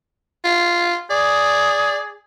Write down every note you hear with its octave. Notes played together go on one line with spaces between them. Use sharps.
F4
G#4 D5